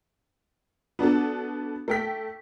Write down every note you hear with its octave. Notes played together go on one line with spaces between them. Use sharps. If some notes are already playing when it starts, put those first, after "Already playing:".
B3 D4 F#4 A4
A3 G5 B6